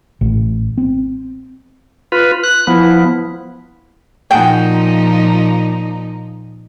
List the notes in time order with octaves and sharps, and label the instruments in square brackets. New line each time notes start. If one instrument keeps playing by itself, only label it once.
[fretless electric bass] A1
C4
[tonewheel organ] F4 B4
F#6
[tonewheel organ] F3 B3 [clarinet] E4
[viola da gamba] A#2 F3 D#4 [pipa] F#4 G#4 G5